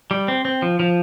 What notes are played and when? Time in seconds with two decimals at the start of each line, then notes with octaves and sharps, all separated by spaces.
0.11 G3
0.28 C4
0.45 C4
0.62 F3
0.80 F3